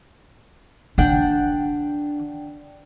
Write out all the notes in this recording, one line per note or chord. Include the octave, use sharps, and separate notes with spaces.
D3 D4 F#5 G5